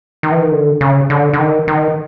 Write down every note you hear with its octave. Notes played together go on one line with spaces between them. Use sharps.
D#3
E3
D#3
D3
C#3
D3
D3
D#3
D#3